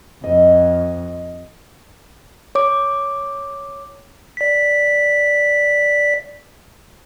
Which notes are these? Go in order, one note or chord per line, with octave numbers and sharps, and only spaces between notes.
F2 D#5
C#5 D6
D5 B6